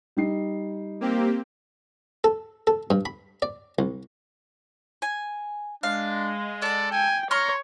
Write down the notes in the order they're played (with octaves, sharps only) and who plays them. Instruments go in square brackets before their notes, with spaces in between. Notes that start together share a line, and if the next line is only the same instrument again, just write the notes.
[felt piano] G3 D#4 C7
[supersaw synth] A#3 C4 G4
[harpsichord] A4
A4
G2
B5
D5
C2
[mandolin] G#5
[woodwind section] G#3 [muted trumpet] D4 [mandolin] F5
[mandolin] A4 F#5 [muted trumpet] D5
[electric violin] G5 [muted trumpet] G#5
[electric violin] C#5 [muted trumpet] A#5 [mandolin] C6 C#6 F6